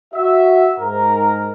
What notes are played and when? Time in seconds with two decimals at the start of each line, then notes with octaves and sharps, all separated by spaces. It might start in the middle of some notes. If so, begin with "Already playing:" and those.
0.14 F#4 E5
0.79 G#2 A#4